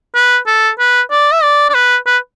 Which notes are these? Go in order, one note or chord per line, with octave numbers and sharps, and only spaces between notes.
B4
A4
B4
D5
E5
D5
D5
B4
B4